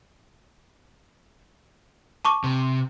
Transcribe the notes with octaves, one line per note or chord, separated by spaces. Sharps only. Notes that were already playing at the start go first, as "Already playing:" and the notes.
A5 C#6 D6
C3